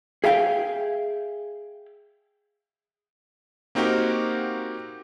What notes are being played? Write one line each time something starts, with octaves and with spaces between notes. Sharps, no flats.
G#4 E5 F5 G5
A#3 C4 D#4 F#4 G4 A#4